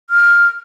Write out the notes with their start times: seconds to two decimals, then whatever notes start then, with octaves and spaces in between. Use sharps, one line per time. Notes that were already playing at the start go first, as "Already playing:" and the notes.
0.10 F6